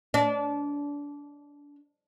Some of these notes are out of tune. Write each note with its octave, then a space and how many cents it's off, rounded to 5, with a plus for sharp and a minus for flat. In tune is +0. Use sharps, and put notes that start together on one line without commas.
D4 -25